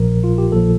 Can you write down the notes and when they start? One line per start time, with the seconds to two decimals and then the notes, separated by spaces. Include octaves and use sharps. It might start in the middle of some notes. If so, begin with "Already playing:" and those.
Already playing: A#1 A#2 F3 A#4
0.24 F4
0.38 G4
0.52 A#1 A#2 F3 A4